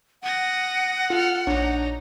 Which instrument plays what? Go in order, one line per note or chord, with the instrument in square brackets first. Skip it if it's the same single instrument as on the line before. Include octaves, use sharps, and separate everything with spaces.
[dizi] F#5 [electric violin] D#6 A#6
[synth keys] F4 [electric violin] A4 F6
[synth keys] A#1 D4 C#5 [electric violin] D#4 A#5